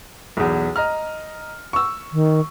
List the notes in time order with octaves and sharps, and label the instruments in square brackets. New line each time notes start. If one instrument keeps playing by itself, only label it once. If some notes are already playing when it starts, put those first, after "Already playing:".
[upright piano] B1 E2
D#5 A#5 F6
C#6 E6
[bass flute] D#3